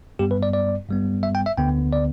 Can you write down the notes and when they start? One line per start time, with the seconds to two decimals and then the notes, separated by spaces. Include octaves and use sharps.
0.19 G2 G3 B3 G4
0.31 B4
0.43 D5
0.53 D5
0.89 G2 G3 B3
1.23 E5
1.35 G5
1.46 E5
1.57 D2 D3 B3 G5
1.93 D5